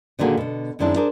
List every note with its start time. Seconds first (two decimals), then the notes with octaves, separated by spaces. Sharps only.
0.19 A#2 D3 D#3 A#3 F#4 G#4
0.37 B2 D3
0.79 F#2 D#3 G#3 C4 D4 E4
0.96 D4 G#4 A#4 C5